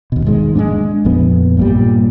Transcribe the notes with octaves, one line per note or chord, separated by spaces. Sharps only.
D#2 B2
E1 G#2 D#3 G#3
G#3 A3 D4
A#1 F2 B3
G2 A#2 G3